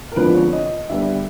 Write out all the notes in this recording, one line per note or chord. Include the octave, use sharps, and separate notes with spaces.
A#4
F2 D3 F3 G#3 B3 B4
C#5
D#5
D3 G3 B3 E5